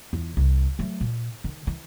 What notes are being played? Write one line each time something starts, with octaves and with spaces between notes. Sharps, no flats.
E2 F4
C2
F#3 A3
A#2
D#3
E3